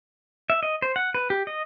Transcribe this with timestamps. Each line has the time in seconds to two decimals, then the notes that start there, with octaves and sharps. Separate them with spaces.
0.50 E5
0.63 D#5
0.82 C5
0.96 F#5
1.14 B4
1.30 G4
1.47 D#5